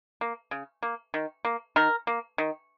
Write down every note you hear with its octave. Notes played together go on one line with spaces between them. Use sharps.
A#3
C#3
A#3
D#3
A#3
D#3 A#4
A#3
D#3